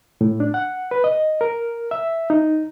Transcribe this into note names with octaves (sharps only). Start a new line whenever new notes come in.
A2
D4
F#5
B4
D#5
A#4
E5
D#4